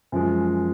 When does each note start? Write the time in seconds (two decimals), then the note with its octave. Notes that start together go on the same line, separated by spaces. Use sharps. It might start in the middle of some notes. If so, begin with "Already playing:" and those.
0.12 F#2 F3 G#3